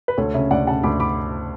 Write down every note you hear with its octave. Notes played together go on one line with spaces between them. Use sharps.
B4
D2 A4 C#5
C#3 C#5 E5
D2 D5 F#5
C#3 F#5 A5
D2 B5 D6
B5 D6